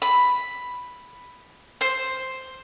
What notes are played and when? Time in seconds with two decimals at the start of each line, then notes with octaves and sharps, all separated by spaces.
0.02 B5
1.81 C5